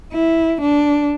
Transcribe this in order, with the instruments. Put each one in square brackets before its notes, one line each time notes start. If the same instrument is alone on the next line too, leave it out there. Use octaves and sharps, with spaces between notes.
[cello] E4
D4